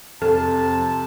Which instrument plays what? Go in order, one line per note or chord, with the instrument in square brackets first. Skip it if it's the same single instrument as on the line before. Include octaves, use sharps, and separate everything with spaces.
[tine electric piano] F2 [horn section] C3 A5 [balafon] A4